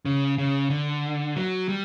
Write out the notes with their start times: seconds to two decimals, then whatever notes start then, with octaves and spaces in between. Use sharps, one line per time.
0.05 C#3
0.38 C#3
0.70 D3
1.36 F#3
1.69 G3